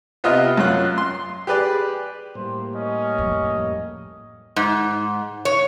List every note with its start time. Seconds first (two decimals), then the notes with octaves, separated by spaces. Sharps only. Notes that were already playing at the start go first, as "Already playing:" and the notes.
0.24 C3 B3 F4 G4 D#5 F6
0.57 F#2 C#4 F4 F#6
0.98 C6
1.47 G4 G#4 B4 D5
2.35 A2 G3 A#3 C5
2.75 C#4 D#5
3.18 F2
4.56 G#2
5.45 C#5